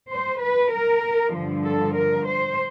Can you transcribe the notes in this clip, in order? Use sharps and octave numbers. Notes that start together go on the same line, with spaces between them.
C5
B4
A#4
G2 D3 F3
A4
A#4
C5